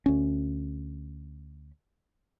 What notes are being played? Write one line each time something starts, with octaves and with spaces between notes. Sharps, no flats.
D2 C#4